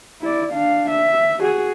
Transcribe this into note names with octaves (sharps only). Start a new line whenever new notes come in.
E4 D5
D4 F5
E5
F#4 G#4